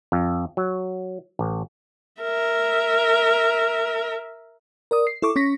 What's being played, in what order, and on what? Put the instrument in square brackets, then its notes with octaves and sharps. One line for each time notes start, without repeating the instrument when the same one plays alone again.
[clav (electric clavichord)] F2
F#3
A1
[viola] A#4 E5
[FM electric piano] A#4 D5 D#6
C7
E4 A4 C#6 D6
C#4 C#6 A#6 B6